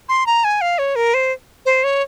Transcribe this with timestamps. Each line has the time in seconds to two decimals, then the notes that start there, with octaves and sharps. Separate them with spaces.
0.09 C6
0.27 A#5
0.44 G#5
0.61 F5
0.79 C#5
0.96 A#4
1.14 C5
1.66 C5
1.84 C#5